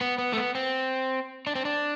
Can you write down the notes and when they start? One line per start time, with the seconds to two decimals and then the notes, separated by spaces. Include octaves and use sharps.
0.01 B3
0.18 B3
0.33 A3
0.37 B3
0.55 C4
1.47 D4
1.55 C4
1.65 D4